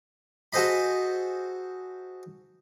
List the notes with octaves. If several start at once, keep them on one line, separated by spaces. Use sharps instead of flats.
F#4 G#4 A4 C5 D#5 B5